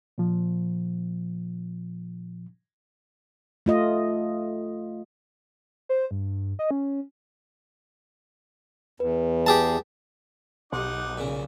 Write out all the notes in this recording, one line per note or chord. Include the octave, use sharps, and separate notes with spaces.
A#2 F3
A3 F4 D#5
C5
G2
D#5
C#4
E2 B4
G4 G#4 A5
B1 B2 D#4 G4 F#5 D6
A#2 C#3